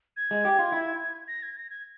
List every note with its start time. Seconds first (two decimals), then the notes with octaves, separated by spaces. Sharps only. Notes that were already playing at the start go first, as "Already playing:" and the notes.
0.17 G#6
0.31 G#3
0.45 G4
0.59 F4
0.73 E4
1.28 A#6
1.43 G#6
1.57 A#6
1.70 G#6